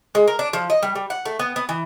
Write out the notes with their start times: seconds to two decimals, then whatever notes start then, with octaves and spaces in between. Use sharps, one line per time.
0.15 G#3
0.27 A#4
0.39 D4
0.53 F3
0.70 D#5
0.83 G3
0.95 G3
1.10 F#5
1.25 A3
1.39 B3
1.56 B3
1.69 E3